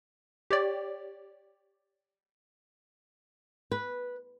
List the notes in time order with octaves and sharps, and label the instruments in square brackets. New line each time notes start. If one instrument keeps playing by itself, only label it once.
[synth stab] G4 C#5 D5
[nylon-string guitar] B4